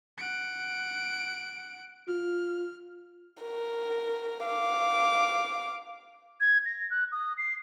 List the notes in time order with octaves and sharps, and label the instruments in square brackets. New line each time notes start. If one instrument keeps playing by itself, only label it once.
[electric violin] F#5 D7
[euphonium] F4 [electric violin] F6
[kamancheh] A#4
F5 D6
[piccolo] G#6
A#6
F#6
D#6
C7